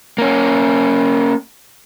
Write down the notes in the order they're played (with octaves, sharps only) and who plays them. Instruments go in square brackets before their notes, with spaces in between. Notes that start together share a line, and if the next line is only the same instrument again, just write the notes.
[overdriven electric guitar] A#3 C#4